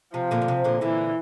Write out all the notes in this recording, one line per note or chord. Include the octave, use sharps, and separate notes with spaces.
C3 F3
A#2 D3
A#2
C3
A#2 D3
A#2 D3 E3